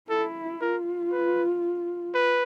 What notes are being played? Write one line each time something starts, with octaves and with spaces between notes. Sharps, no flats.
E4 A4
F4 A#4
B4
B4